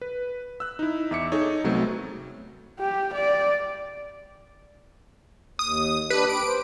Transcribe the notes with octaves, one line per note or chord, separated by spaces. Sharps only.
B4
E6 F#6
D#4 E4
E2 E5 D6 C#7
D#4 G#4 A4 C#5
C2 F#3 A3 B3 C4
G4
D5
D#2 D#6
D4 G4 B4
G4 B4 D7
C5